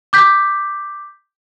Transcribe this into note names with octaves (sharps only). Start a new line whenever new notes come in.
D6 G6 B6